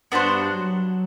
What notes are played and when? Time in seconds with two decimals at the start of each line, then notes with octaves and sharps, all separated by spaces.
0.11 G2 B3 D4 F#4 C5
0.52 F#3